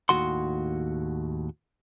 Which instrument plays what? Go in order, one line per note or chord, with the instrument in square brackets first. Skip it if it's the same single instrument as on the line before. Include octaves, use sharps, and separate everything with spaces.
[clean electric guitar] D#2 A2 F3 F#4 F#5 C6